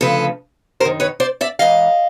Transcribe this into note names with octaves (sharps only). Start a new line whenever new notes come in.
D2 C#3 F3 A4 B4
F#2 D#3 A#4 C5
B4 C#5
C5 D5
D5 E5
G#2 E3 D#5 F5